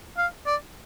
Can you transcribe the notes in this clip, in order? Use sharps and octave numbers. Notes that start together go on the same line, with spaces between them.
F5
D5